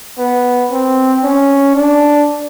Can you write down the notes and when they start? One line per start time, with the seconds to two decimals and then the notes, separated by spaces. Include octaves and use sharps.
0.18 B3
0.71 C4
1.24 C#4
1.75 D4